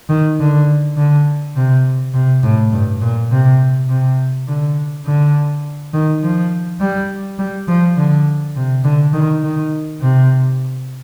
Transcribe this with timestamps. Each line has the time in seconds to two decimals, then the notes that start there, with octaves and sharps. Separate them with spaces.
0.09 D#3
0.40 D3
0.97 D3
1.56 C3
2.14 C3
2.43 A2
2.72 G2
3.01 A#2
3.31 C3
3.89 C3
4.48 D3
5.06 D3
5.94 D#3
6.23 F3
6.80 G3
7.39 G3
7.68 F3
7.97 D3
8.56 C3
8.84 D3
9.13 D#3
9.44 D#3
10.01 C3